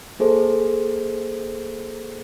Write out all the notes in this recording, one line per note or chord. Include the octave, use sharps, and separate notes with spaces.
A#3 G#4 A4 C5